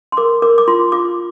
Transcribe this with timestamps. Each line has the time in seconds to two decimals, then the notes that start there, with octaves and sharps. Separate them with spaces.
0.12 C6
0.17 A#4 D6
0.42 A#4 D6
0.58 D6
0.68 F4 C6
0.92 F4 D6